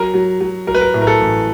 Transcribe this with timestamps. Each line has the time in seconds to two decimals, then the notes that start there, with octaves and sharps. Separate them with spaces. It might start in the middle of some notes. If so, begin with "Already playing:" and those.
Already playing: F#3 A#4
0.14 F#3
0.40 F#3
0.67 F#3 A#4
0.75 B4
0.81 A#4
0.94 A2
1.02 A#4
1.07 A4
1.20 A1